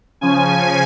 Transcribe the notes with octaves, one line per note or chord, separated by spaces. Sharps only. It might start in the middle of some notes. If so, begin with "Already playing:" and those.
C#3 F3 C#4 G#5